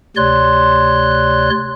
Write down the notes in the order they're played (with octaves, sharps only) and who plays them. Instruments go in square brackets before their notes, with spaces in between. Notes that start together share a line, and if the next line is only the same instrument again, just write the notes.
[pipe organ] D2 C3 C#5 D5 C6 F#6